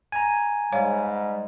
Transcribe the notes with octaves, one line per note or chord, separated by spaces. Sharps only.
G#5 A#5
G#2 G3 C#5 F5